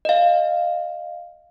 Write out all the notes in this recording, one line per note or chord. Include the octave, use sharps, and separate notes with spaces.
D#5 F5